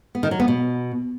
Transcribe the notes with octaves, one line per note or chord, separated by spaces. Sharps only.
B3
D#3
F#3
B3
B2